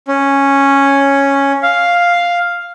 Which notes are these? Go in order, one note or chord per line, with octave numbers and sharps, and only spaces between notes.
C#4
F5